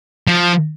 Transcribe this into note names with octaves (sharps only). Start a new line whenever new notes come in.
F3